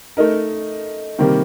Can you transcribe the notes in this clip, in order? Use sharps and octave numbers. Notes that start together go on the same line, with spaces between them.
A3 D#4 A#4
C3 D#3 G3 A#3